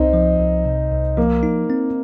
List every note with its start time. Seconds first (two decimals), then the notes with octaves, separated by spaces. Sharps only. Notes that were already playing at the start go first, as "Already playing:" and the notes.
Already playing: C2 C4 D#4
0.13 F3
0.39 C2
0.65 C3
0.92 C2
1.17 F3 A#3
1.43 D#4
1.70 C4